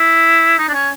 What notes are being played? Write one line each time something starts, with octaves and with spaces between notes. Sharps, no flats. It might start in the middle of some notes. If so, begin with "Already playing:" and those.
Already playing: E4
D#4
D4
C#4